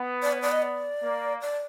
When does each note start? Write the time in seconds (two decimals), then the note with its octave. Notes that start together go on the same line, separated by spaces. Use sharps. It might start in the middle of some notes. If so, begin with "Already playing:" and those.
Already playing: B3
0.22 D5
0.33 C#5
0.42 D5
0.52 D#5
0.62 D5
1.02 A#3
1.42 D5